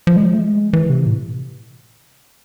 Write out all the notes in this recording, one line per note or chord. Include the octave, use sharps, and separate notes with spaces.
F3
G#3
F3
A3
G#3
E3
C3
A2